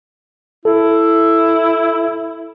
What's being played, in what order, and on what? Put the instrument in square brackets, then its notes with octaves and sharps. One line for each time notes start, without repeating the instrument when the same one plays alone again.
[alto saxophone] E4 [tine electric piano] A4